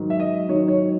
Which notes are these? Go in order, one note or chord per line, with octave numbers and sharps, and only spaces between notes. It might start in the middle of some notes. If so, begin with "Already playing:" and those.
Already playing: G#2 D#3 F#3
E5
D#5
G#2 D#3 F#3 C#5
C#5